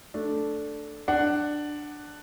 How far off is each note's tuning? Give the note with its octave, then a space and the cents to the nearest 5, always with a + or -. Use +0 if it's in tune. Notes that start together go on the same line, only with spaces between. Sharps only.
A3 +0 D4 +0
D4 +10 F#5 +10